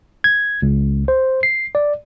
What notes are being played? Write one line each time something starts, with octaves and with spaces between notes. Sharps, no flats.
G#6
C#2
C5
C7
D5